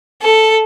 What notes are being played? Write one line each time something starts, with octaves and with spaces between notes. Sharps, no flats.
A4